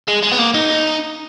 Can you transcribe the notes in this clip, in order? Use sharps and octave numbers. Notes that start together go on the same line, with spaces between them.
G#3
G#3
B3
A#3
D#4